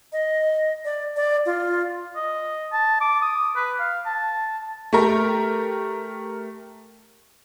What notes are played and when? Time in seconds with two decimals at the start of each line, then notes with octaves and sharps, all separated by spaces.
0.13 D#5
0.85 D5
1.16 D5
1.46 F4
2.16 D#5
2.72 A5
3.01 D6
3.22 D#6
3.56 B4
3.80 F5
4.06 A5
4.93 A3 G4 A#4